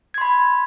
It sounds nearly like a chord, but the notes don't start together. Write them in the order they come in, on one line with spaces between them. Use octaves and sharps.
G#6 C6 B5